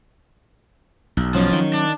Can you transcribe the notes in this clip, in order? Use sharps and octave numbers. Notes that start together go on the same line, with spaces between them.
B1
F2 F3 F#3 C#4
D#3
D4